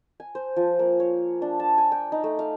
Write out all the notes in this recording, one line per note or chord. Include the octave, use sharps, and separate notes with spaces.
G#5
C5
F3
A#3
C#5
D4
A5
G#5
G5
D#4
A3
F5